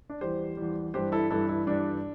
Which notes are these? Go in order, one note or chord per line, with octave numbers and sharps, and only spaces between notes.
D4
E2 E3 G3 G4 C5
E2 E3 G3
G2 E3 G3 G4 C5
E4 A4
G2 E3 G3 E4 A4
E4
G2 E3 G3 D4